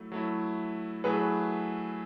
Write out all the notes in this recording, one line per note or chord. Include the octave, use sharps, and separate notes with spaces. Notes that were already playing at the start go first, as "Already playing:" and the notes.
Already playing: F#3 A3 E4
F#3 A3 E4
F#3 A3 E4 G#4 B4